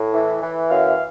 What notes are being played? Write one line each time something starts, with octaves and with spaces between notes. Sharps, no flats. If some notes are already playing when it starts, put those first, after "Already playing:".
Already playing: A2
E3
E3
F#2 F5